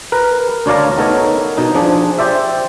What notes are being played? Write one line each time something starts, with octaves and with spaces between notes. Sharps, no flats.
A#4 B4
D2 D4 C#5 D5 F5 A#5
B3 D#4 A4 A#4 C#5
B2 D#4
F3 D4 G#4
G4 C5 D5 E5